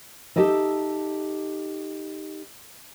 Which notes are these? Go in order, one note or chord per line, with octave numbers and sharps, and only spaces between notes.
D#4 G4 A4 D#5 E5